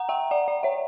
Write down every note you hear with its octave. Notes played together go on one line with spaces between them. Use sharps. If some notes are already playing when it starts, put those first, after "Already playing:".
Already playing: F#5 A#5
E5 G5
D5 F#5
D5 F#5
C#5 E5